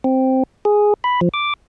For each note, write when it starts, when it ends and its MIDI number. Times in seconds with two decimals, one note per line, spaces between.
0.04 0.43 60
0.65 0.94 68
1.04 1.20 83
1.21 1.29 53
1.34 1.54 86